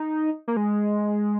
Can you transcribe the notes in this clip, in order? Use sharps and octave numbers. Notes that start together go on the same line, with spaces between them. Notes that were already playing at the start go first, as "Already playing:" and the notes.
Already playing: D#4
A#3
G#3